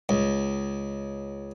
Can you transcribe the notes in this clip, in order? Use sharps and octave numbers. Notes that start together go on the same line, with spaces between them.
C#2